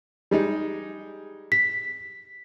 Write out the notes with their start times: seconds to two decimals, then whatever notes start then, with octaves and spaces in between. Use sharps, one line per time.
0.31 G3 G#3 D#4
1.52 B6